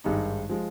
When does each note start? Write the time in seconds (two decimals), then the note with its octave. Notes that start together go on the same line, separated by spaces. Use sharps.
0.04 G#1 G2 D#3 G#3 D#4
0.49 F3 G#3